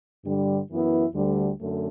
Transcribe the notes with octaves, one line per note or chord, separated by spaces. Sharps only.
G2 D3 G3
F#2 E3 B3 E4
D2 D3 G3
F#2 D3 A3